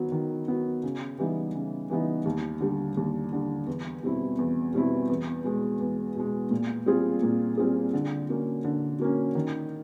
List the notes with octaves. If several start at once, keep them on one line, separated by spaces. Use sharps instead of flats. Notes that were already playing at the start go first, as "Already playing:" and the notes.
Already playing: D#3 F#3 B3
D#3
F#3 B3
C#3
E3 G3 B3 D#4
C#3
E3 G3 B3 D#4
D#2
D3 G3
D#2
D3 G3
E2
B2 G3 C4 E4
E2
B2 G3 C4 E4
E2
B2 G#3
E2
B2 G#3
A#2
G3 C4 F4 G#4
A#2
G3 C4 F4 G#4
D3
F#3 A#3 C#4
D3
F#3 A#3 C#4
D#3